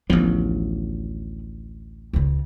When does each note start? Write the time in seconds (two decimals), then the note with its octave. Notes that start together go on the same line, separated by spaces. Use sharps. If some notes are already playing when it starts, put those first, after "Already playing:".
0.10 A1 D2 F3 B3
2.13 C#2 C#3